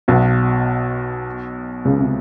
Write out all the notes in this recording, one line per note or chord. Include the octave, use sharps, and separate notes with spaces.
B1 B2
C#2 C#3
C3